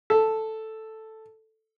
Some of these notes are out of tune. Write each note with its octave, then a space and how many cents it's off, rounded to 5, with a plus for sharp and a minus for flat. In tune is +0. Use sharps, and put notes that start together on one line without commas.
A4 +0